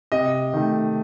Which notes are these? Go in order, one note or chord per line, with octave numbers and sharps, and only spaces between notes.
C3 D#5
D#3 A3